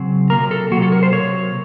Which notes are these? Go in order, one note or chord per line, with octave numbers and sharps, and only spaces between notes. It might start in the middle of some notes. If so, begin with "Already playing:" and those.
Already playing: C#3 F#3 C4
C3 F#3 A#3 A#4
A4
C3 F#3 A#3 F#4
A4
A#4
C5
C3 F#3 A#3 C#5